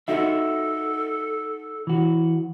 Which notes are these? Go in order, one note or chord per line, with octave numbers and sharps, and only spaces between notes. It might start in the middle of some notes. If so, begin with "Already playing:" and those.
D#4 F#4 A4 E5
E3 F#4